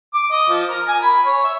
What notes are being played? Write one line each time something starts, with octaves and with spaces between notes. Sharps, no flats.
D6
D#5
F3
A#4
G#5
B5
C#5
E5